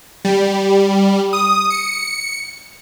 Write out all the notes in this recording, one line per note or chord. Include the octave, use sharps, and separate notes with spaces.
G3
D#6
C#7